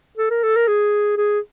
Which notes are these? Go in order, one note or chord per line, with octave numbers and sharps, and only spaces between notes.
A4
A#4
A4
A#4
G#4
G#4